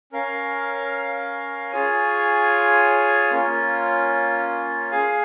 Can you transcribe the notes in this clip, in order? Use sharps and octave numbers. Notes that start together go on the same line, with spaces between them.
C#4 A#4 F5
F4 G#4 C#5 G#5
A#3 C#4 F4
G#4 F5 G#5